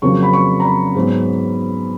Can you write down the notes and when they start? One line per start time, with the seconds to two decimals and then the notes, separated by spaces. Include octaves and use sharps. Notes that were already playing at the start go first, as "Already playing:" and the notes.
0.02 F2 C#3 F#3 A#3 C#6
0.23 B5
0.33 C#6
0.60 A#5
0.64 B5
0.95 G#2 F#3 B3